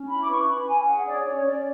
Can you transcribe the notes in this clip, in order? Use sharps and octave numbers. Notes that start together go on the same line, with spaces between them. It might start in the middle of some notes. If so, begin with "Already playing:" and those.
Already playing: C#4
E4 B5
D6
B4 C#6
C#4 B5
C#4 G#5
G#4 F#5
C#5 D5
C#4 C#5
C#4 D5